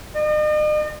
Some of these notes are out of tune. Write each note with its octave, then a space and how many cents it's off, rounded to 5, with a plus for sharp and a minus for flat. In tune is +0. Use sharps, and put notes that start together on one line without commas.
D#5 -45